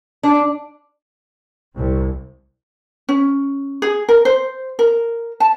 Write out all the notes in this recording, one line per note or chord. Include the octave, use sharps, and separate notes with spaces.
D4
C2
C#4
G#4
A#4
C5
A#4
A5